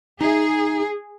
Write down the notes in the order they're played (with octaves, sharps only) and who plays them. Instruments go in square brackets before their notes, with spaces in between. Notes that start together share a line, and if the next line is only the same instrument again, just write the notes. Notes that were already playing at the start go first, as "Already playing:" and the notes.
[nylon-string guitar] D#4 E5 [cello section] G#4